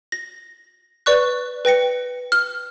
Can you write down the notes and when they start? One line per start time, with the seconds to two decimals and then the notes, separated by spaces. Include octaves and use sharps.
0.12 A#6
1.06 B4 D5 C#6 F#6
1.65 B4 G5 A#6 C#7
2.32 F6